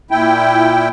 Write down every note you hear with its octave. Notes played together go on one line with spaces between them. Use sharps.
A#2 E4 G5